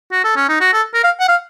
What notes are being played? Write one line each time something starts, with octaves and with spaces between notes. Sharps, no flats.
F#4
A4
C#4
D#4
F#4
A4
A#4
F5
F#5
F5